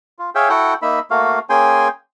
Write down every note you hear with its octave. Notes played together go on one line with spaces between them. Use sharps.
F4
G#4 C#5 E5 F5 G5
E4 F#4 A4 F#5 G5
A#3 D#4 E5 B5
A3 A#3 F#4 F5
A#3 C#4 G#4 G5 G#5 C6